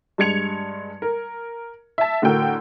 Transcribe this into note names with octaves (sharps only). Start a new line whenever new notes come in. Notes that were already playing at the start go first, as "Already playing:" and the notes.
G2 G#3 G#6 C#7 F7
A#4
E5 A5
A2 D3 F#4 A#4 G5 E6